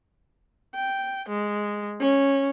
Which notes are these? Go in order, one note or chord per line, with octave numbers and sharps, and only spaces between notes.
G5
G#3
C#4